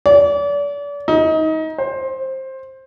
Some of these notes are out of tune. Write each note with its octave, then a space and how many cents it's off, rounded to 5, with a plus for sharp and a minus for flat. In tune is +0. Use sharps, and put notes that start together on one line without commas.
D5 -35
D#4 +25
C5 +15